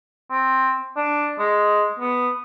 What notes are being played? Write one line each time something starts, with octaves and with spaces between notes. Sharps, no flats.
C4
D4
G#3
B3